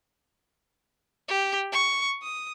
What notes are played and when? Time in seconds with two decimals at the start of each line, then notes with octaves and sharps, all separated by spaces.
1.28 G4
1.72 C#6
2.22 D#6